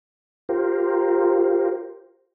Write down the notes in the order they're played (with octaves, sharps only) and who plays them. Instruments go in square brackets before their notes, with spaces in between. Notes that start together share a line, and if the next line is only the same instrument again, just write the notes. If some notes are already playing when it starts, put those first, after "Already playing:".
[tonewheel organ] F4 G4 A#4 C5